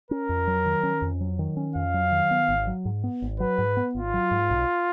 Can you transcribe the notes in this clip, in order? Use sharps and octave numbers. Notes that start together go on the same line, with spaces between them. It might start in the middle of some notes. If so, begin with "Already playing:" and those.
C#4 A#4
F2
F#3
D#3
C#4
F2
F#3
D#3
C#4
F2 F5
F#3
D#3
B3
G#1
F#3
G#2
B3
G#1
F#3 B4
G#2
B3
G#1 F4
F#3
G#2
B1